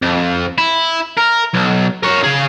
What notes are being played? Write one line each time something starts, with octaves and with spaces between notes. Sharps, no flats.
F2
E4
A#4
B1
A#4 C#5
C#3 G#4